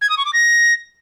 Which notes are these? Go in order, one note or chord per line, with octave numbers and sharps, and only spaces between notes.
G#6
D#6
C#6
D6
A#6